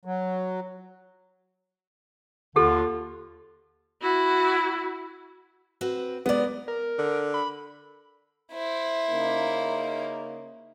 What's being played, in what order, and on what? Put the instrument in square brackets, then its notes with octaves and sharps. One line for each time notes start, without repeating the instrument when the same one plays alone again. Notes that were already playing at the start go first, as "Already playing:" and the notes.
[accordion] F#3
[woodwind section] D#2 D3 F4 [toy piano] G4 A4
[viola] E4 F#4
[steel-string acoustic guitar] C4 F#4 B4
[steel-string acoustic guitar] G#3 A#4 [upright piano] B3 D5
[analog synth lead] A#4
[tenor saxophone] D3
[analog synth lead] B5
[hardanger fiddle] E4 C5
[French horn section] C#3 A#3 D#4